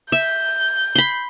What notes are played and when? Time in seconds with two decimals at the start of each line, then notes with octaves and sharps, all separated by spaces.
0.12 E5 G6
0.95 B5 C6